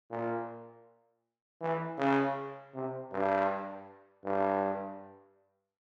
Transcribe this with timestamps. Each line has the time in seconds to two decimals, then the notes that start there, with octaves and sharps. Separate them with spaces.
0.11 A#2
1.62 E3
1.98 C#3
2.75 C3
3.12 G2
4.25 G2